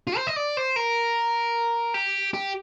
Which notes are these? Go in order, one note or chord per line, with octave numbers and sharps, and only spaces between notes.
F4
C5
D#5
D5
C5
A#4
G4
G4